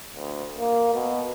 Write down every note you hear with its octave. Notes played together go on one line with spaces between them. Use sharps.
D2
A#3
B2